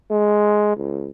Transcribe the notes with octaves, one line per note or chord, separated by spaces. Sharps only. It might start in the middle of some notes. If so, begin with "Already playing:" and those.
G#3
C#2